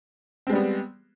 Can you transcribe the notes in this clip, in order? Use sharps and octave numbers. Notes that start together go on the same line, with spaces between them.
G3 G#3 B3 C4